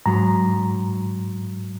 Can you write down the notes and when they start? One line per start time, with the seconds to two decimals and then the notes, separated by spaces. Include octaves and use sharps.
0.06 G#2 F#3 A#5